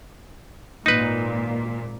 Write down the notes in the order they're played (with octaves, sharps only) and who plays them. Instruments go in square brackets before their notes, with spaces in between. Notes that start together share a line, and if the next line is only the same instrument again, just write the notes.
[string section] G#1 A#2 [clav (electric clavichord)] D#4 B4